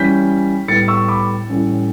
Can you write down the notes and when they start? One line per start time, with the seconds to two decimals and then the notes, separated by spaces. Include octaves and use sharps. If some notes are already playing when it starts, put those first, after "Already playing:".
Already playing: E3 G3 C#4 G6 B6
0.68 A2 G3 B3 A6 C#7
0.88 C#6 E6
1.08 B5 D6
1.49 A2 E3 G3 C#4